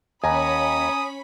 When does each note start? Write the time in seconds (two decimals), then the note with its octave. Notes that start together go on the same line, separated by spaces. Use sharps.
0.24 D#2 C#4 G#5 A#5 B5 D#6